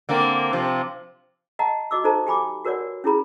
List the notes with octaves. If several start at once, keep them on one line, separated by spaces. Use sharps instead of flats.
D3 A#3 C4
C3 F3
D#5 F#5 A5 A#5
F#4 D#5 D6 E6
D#4 A4 C5 A5 A#5
G4 G#5 B5 D6
F#4 A#4 B4 C#5 D5 F#5
C#4 E4 G#4 A#5 B5